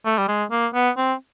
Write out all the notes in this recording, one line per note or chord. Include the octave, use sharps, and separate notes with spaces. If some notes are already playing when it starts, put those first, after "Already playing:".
A3
G3
G#3
A#3
B3
C4